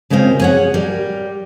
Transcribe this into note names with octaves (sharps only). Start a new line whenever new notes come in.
C#3 G#3 A#3 C4 F4
G#4 C#5 F#5
G3 A#4